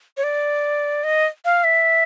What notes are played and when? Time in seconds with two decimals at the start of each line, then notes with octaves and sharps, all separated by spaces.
0.17 C#5
0.24 D5
1.04 D#5
1.45 F5
1.64 E5